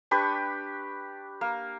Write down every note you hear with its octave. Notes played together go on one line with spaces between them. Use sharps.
D4 G4 B4 C#6
A#3